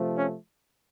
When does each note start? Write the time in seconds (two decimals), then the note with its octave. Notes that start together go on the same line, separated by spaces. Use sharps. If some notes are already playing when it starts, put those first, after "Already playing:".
Already playing: C3 F3 A3
0.17 C#4